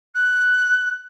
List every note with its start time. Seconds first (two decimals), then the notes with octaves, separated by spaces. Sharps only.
0.15 F#6